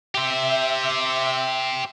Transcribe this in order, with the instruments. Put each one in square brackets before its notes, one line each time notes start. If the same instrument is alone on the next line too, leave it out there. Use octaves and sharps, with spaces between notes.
[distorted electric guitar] G4 C5 [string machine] E5